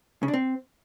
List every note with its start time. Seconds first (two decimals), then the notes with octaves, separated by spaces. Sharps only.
0.23 C#3
0.28 D4
0.34 C4